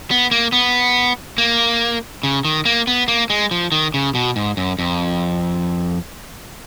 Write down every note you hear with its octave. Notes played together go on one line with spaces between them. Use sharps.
B3
A#3
B3
A#3
C#3
D#3
A#3
B3
A#3
G#3
F3
D#3
C#3
B2
G#2
F#2
F2